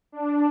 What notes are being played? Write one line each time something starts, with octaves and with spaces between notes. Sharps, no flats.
D4